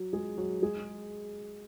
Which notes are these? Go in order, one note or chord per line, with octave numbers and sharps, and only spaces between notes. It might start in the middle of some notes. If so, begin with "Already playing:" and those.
Already playing: F#3 F#4
G#3 G#4
F#3 F#4
G#3 G#4